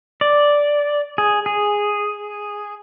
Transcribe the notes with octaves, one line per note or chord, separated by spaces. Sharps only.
D5
G#4
G#4